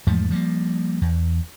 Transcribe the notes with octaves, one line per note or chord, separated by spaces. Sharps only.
E2 G#2 F3 A3
F3 G3 G#3 A#3
E2